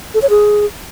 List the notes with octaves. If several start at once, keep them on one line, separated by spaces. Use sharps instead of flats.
A4
C#5
G#4